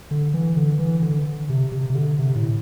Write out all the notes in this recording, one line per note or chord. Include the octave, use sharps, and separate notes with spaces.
D3
E3
D3
E3
D3
C3
C3
C3
D3
C3
A2